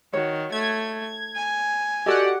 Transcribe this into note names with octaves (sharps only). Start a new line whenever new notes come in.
D#3 F#4 C#5
A3 G#6
G#5
F#4 G4 A4 D5 D#5 F#5